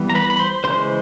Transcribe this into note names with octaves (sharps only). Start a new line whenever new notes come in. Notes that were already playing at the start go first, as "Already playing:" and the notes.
Already playing: E3 G3 B3
A#5
B4 B5
B5
C5 C6
C#3 E3 G#3 C5 C6